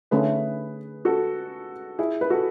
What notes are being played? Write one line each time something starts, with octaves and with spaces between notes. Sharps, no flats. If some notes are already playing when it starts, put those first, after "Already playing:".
D3 A3 C#4 G#4 B4
F#4 A4
E4 G#4
B4
F#4 A4